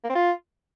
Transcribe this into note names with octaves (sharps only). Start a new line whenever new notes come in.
A#3
C4
F4